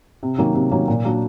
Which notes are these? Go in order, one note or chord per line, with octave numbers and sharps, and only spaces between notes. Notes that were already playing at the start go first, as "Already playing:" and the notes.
C3
D#3 F#3 A#3 C#4
C3
D#3 F#3 A#3 C#4
A#2
F#3 A#3 D4 F#4